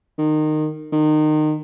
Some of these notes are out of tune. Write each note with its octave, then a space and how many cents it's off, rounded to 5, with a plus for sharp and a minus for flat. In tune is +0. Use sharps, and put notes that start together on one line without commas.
D#3 -20
D#3 -25